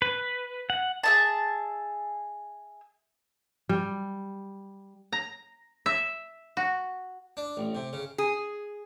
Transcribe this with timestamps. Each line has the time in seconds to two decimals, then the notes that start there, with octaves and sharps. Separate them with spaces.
0.02 B4
0.70 F#5
1.03 G#4 E5 A5
3.69 G3
5.13 A#5
5.86 E5
6.57 F#4
7.37 D4
7.57 A1
7.75 C3
7.93 C#3
8.18 G#4